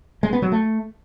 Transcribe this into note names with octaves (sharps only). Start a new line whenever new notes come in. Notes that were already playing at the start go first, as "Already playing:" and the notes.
G#3
B3
F#3
A3